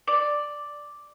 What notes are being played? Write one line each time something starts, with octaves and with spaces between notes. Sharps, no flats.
D5